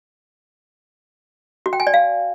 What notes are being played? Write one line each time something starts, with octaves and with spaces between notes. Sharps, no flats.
F#4
G5
G#5
D5
F5